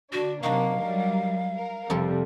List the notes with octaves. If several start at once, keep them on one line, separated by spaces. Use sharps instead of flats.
D3 D4 F#4
C3 F#3 A#3 D4 D#4 F#4 F5
F#3 G3 A#4
A#4
F2 C3 F3 G3 A4